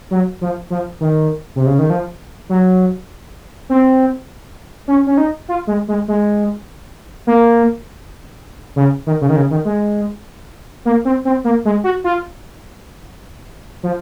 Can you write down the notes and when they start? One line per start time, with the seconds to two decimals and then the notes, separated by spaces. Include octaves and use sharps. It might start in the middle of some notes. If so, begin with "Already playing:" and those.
0.11 F#3
0.41 F3
0.70 F3
1.00 D#3
1.56 C3
1.66 C#3
1.79 D#3
1.90 F3
2.49 F#3
3.69 C4
4.88 C#4
5.07 C#4
5.18 D#4
5.49 F4
5.67 G#3
5.88 G#3
6.08 G#3
7.27 A#3
8.76 C#3
9.07 D#3
9.21 C#3
9.29 D#3
9.36 C#3
9.51 D#3
9.65 G#3
10.85 A#3
11.05 C4
11.25 C4
11.44 A#3
11.65 G#3
11.84 F#4
12.04 F4
13.83 F3